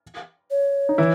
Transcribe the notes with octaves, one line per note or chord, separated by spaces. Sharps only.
C#5
D#4
E3 E4